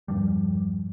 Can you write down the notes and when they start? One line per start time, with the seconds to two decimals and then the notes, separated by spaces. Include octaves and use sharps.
0.08 E1 G2 F3 G3